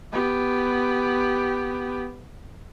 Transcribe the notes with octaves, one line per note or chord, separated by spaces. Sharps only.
B3 G4